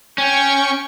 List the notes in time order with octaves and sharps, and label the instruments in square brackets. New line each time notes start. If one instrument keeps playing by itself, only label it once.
[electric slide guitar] C#4 [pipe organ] G5 C#6